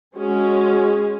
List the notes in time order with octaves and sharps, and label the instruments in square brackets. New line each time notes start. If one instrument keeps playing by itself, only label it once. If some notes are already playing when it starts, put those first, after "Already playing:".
[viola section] G#3 C#4 G#4 [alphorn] F#4